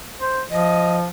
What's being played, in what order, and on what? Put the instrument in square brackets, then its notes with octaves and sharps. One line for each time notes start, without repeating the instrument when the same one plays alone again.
[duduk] C5
[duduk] F3 [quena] D#5